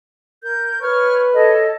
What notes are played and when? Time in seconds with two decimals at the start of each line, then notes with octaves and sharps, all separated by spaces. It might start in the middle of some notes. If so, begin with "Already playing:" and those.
0.42 A#4 G6
0.81 B4 C#5 C#6 F6
1.33 A4 C#5 D#5